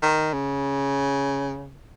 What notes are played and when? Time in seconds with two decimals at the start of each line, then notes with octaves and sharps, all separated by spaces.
0.03 D#3
0.33 C#3